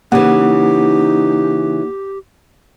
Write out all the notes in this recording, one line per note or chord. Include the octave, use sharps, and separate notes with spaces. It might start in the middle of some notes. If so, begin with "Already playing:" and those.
C#3 E3 A#3 D#4 G4 F#5